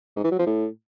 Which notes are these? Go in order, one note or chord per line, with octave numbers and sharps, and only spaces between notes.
G#2
E3
F#3
F3
A2